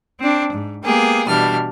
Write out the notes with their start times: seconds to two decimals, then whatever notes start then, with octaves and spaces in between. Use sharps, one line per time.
0.21 C4 D4
0.53 G#2
0.84 G#3 A#3 B3 G4 G#4
1.26 B2 E3 G3 D4 F6